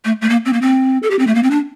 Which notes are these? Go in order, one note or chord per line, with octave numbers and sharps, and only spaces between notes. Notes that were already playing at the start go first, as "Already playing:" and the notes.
A3
A3
A#3
C4
A#3
C4
A4
G4
C4
A3
A#3
C4
D4